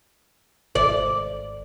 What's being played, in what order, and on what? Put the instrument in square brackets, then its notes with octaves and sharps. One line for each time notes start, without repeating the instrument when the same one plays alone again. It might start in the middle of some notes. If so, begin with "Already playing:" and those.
[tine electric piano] G#1 [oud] D5